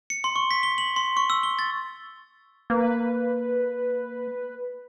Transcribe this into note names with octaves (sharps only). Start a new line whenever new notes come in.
C#7
C6
C#6
B6
G7
F#7
C6
C#6
E6
G7
A6
A#3 B4